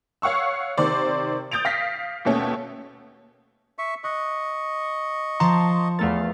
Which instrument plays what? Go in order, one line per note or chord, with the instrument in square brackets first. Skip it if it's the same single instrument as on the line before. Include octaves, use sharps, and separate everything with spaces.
[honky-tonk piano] C#5 F5 F#5 C#6 E6
C3 D#3 C5 D5
D#6 G6 A6 D7 F7
F5 A#6 B6
D#2 B2 A3 C#4
[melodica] E5 C#6
[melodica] D#5 C#6 [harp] F#6
[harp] F3 [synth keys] A5 A#5 C6
[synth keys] E2 A3 A6 [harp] A#4 F5